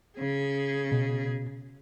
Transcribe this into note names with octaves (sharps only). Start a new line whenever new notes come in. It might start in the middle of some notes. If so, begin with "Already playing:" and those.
C#3 G#4
B2